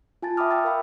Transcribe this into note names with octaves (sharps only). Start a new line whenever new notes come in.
F4 G#5 A5 A6
E5 G5 B5 D6 D#6 F6
G5 E6 A6
A#4 E5 F5 G5 B5